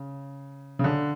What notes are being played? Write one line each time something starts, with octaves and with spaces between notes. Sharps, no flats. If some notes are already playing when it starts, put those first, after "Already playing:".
Already playing: C#3
C#3
D3